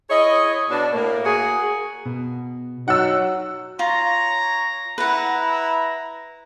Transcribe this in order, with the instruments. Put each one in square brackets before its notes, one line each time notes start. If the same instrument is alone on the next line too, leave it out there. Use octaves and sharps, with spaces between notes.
[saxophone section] E4 G#4 C#5 D#5
B2 D4
A2 A#3
A#3 F#4 G#4
[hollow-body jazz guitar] B2
[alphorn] F#3 [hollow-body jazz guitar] D#4 [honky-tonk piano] F#5 E6
[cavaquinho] F4 [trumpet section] C#5 A#5
[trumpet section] E4 A#5 [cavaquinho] B4 F#5